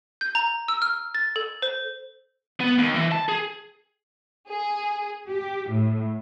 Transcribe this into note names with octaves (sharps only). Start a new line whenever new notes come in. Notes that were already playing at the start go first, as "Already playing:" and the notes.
G6
A#5
E6
F6
A6
A4
C5
B3
D#2
E3
A5
G#4
G#4
G4
A2